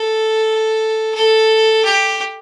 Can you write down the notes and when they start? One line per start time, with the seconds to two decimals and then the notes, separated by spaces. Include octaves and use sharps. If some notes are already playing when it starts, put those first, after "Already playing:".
Already playing: A4
1.14 A4
1.84 G4